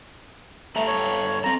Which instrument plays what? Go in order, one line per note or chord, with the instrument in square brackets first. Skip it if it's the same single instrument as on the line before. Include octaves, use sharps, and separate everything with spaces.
[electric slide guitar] G2 A4 A#5 [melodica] A3
[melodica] C#5
[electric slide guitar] C4 A4 [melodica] A#5